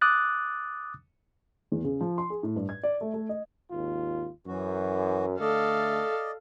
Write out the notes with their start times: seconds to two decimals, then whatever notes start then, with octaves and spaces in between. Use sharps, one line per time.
0.01 D6 D#6 F#6 A6
1.72 E2
1.84 C#3
2.01 F3
2.18 C6
2.30 G#4
2.43 A2
2.56 G2
2.69 G#6
2.83 D5
3.01 A3
3.14 A3
3.29 D#5
3.71 G#1 D#2 F4
4.47 F#2 E3 F#4
5.40 D3 A3 A4 D5 D#5 F5